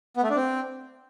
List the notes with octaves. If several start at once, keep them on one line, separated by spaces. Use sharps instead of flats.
B3
A3
D4
C4